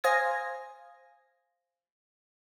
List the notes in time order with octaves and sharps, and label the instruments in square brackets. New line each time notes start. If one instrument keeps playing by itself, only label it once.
[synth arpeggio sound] C5 F5 G#5 D#6 G#6 A#6